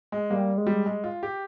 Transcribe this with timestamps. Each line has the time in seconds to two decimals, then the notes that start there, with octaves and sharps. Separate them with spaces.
0.12 G#3
0.30 G3 A#3
0.58 G#3
0.67 G3
0.86 G#3
1.04 F4
1.23 G4